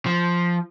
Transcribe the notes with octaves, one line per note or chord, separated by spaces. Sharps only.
F3